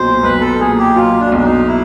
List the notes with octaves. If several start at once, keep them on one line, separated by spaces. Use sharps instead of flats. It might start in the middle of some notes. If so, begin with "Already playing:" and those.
Already playing: B1 A#2 F#3 C5
B1 B4
A4
A#2 G#4
G4
F#3 F4
D4
B1 D4
D#4
E4